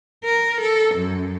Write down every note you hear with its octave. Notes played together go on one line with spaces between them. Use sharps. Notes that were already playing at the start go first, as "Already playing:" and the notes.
A#4
A4
F#2